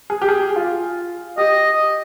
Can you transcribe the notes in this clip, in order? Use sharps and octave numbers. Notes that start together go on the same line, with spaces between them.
G#4
G4
G#4
F4
G4 D#5